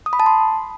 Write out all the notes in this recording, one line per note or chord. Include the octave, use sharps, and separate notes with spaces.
D#6
B5
A5
C6